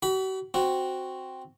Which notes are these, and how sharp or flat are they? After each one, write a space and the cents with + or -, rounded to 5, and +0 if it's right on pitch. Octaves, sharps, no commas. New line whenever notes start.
F#4 +45 B5 +0
C4 +0 F#4 +0